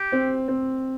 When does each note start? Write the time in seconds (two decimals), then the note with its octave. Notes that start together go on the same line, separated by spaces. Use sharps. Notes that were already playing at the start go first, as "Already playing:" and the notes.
Already playing: G4
0.12 C4
0.48 C4